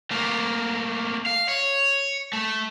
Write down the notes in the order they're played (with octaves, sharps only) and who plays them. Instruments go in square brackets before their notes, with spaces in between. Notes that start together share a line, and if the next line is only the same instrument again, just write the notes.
[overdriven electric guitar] A3 A#3
F5
C#5
A3